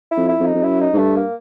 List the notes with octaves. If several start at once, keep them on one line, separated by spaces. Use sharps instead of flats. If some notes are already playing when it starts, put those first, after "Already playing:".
E4
F2
E4
F2
D#4
F2
F#2 E4
D#4
G#2
G2 A3
A#3